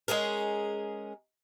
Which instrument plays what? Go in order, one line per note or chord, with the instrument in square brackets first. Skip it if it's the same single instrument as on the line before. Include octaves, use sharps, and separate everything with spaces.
[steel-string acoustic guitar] G#3 C#4 G#4 A#4